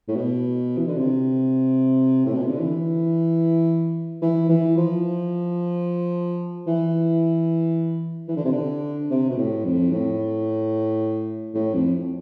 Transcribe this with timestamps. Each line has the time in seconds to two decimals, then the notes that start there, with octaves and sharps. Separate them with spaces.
0.08 A2
0.16 B2
0.77 E3
0.88 D3
0.98 C3
2.26 A2
2.35 B2
2.42 C3
2.51 D3
2.60 E3
4.22 E3
4.49 E3
4.77 F3
6.67 E3
8.28 E3
8.36 D3
8.44 C3
8.52 D3
9.11 C3
9.30 B2
9.37 A2
9.65 F2
9.91 A2
11.55 A2
11.74 F2